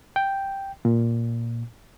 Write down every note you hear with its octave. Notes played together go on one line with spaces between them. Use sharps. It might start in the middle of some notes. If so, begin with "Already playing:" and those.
G5
A#2